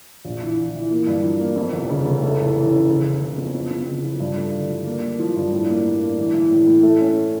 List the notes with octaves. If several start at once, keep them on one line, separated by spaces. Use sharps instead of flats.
A#1
E3
E3
E3
A#3
G2
F3
A#3
F2
F1
C#3
F1
A3
A2
E3
C#4
C#3
C#4
C#3
F2
F2
F2
C#3
F3
G2
A3
D3
F3
A#3
A#3
F3
G2
A2
A#3
A2
A#3
E3
E3
A2
A2
A3
C#4